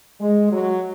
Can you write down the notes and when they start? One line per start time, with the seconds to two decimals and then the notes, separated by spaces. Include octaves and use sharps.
0.20 G#3
0.51 F#3